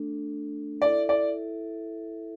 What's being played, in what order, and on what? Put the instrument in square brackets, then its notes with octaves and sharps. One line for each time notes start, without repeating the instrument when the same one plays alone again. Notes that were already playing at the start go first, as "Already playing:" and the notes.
Already playing: [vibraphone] A3 D4 A4
[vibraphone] E4 A4 E5 [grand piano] D5
[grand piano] D5